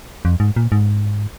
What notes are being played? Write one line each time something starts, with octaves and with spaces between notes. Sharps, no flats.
F2
G#2
A#2
G#2